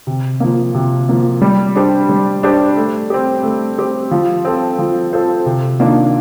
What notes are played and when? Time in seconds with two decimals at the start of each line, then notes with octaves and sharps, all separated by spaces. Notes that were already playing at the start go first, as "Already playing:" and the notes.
0.07 C3
0.40 F3 A#3
0.74 C3
1.09 F3 A#3
1.42 G3
1.75 D4 G4 C5
2.09 G3
2.43 D4 G4 C5
2.77 A3
3.10 C4 G4
3.44 A3
3.78 C4 G4
4.11 F3
4.45 C4 F4 A4 C5
4.79 F3
5.13 C4 F4 A4 C5
5.46 C3
5.79 D#3 A#3 D4 F4